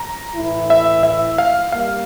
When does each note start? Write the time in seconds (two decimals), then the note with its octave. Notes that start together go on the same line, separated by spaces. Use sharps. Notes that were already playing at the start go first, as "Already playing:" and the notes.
Already playing: A#5
0.36 A2 E3 A3 E4
0.70 E5
1.03 E5
1.38 F5
1.72 G3 A#3 F5